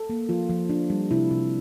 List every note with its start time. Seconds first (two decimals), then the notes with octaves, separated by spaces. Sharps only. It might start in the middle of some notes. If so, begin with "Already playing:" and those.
Already playing: A4
0.10 A#3
0.29 F3 F4
0.50 F3
0.69 D4
0.90 G3
1.11 C3 E4
1.31 C3